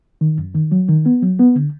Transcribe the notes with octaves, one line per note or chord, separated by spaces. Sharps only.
D#3
F#2
D#3
F#3
D#3
B3
F#3
B3
D3